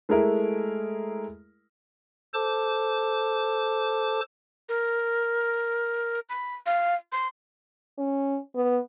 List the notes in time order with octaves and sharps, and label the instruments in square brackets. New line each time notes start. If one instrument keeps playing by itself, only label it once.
[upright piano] G#3 A3 E4 G#4 A#4 E5
[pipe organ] A4 C5 A5 D6
[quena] A#4
B5
F5
C6
[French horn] C#4
B3